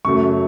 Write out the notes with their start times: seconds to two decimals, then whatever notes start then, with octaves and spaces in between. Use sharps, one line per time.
0.05 F#2 C#3 F#3 A3 C#6